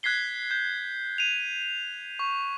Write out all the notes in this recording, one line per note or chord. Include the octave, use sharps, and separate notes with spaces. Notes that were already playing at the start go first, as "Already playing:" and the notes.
F#6 G#6 B6 C7 G7
G6
D#7 F7
C#6